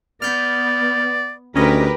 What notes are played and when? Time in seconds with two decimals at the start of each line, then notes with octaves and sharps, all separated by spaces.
0.22 B3 D5 F6 G6
1.56 D2 C#4 G4 A#4 B4 D#5